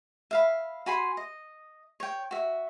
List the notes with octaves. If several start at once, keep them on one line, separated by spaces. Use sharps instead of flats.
E5 F5 B5
F#4 G#5 B5 C6
D#5
C#5 G5
F#4 E5